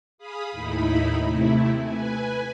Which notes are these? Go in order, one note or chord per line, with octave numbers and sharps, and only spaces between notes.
G#4 F5 B5 D#6
D#2 A2 D#4 E4 B5
C3 A3 E4
B4 G#5